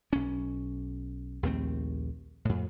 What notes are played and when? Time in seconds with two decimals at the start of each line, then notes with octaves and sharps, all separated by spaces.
0.13 B1 C#4
1.43 A#1 D#2 A3 C4
2.45 F2 A2